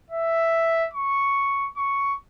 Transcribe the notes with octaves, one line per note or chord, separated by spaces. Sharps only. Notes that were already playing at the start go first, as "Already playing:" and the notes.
E5
C#6
C#6